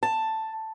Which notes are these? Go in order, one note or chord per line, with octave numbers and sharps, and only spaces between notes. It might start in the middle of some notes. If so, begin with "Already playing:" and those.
A5